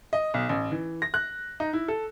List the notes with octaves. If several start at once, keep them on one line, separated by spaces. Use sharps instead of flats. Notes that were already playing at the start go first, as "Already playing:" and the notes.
D#5
B1
A1
E3
A#6
F#6
D#4
E4
A4